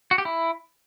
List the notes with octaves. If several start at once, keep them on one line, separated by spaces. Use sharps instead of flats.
F#4
G4
E4